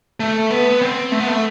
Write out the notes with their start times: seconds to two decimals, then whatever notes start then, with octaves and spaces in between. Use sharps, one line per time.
0.20 A3
0.50 B3
0.82 C4
1.12 A3
1.20 B3
1.28 A3